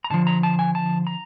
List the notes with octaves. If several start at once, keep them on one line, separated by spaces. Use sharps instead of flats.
A#5
G2 D3 F3 A5
A#5
A5
G#5
A5
A#5